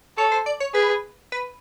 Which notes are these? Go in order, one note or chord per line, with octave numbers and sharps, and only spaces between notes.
A4 C#5
C5
D5
C#5
G#4 B4
B4